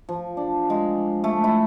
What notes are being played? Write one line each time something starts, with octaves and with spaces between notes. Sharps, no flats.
F3
D4
G#3
A3
E4